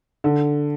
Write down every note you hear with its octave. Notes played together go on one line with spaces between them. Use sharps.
D3